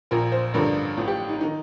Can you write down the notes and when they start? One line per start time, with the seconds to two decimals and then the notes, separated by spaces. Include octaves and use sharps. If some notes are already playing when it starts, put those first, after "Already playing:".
0.11 A#1 A#2 F3 A#4
0.32 C5
0.54 A1 G2 D3 F3 A#4
0.97 A1 A2 F3
1.08 G4
1.29 D#4
1.41 D#3 D#4